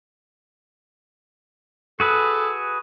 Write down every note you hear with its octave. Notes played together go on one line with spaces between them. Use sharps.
F#4 G#4 A4 B4